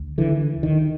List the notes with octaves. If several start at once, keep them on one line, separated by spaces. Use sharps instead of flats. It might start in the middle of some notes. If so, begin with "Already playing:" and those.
Already playing: D2
D3 E3
D#3